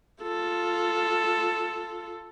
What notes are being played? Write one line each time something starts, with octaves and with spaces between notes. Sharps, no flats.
F4 A4